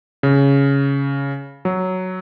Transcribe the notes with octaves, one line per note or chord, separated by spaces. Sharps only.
C#3
F#3